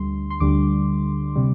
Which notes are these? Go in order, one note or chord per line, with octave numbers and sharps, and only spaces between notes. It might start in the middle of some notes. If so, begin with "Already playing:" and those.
Already playing: D2 D3 G3 C6
C6
D2 D3 G3 D6
C3 G3